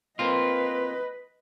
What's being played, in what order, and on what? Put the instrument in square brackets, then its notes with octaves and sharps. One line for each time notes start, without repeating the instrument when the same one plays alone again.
[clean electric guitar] A#3 C4 F4 [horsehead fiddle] B4 D#5